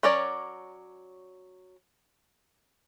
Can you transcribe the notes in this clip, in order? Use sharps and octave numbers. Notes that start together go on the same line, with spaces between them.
F#3 C#4 A#4 C#5 D5